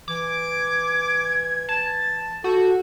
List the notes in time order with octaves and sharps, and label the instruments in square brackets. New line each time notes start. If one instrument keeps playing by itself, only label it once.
[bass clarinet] E3 [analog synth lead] D6 [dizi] G#6
[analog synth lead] A5
[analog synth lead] F#4 [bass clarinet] A4 [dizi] G6